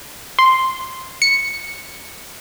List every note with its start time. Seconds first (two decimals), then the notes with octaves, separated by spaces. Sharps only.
0.39 C6
1.22 C#7